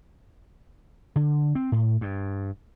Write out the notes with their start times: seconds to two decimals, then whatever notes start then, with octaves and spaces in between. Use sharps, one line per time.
1.16 D3
1.55 C4
1.72 A2
2.01 G2